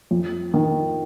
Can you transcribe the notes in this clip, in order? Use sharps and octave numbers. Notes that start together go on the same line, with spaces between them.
F2
D#3